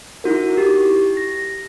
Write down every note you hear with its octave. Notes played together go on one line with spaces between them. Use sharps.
D#4 E4 F#4 A#4
G4
A#6